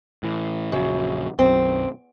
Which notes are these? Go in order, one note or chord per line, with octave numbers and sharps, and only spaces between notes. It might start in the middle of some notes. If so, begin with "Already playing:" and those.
A2 E3
A#1 F#2 C#3
B1 F#2 C4